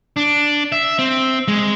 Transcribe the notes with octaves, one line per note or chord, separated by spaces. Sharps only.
D4
E5
C4
G#3